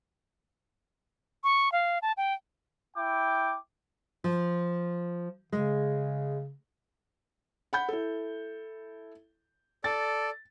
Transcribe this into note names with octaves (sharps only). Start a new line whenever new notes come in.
C#6
F5
A5
G5
E4 G5 D6
F3
C#3 G#3
F#5 B5 G6
E4 A4
A4 D5 A6